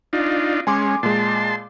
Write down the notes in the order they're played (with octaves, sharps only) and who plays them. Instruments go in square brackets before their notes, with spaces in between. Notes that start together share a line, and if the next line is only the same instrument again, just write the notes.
[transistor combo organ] D4 D#4 F4
[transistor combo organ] G#3 C#4 [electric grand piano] G#5 C6 D6
[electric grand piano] A#2 G#3 [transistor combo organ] A5 C6